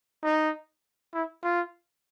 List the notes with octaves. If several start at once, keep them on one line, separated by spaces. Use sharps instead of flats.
D#4
E4
F4